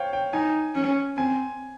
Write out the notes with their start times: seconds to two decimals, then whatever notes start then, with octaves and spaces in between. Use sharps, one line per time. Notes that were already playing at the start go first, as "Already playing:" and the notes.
Already playing: C5 C#5 F5 G5
0.13 G5
0.33 D#4 G#5
0.75 C#4
1.17 C4 G#5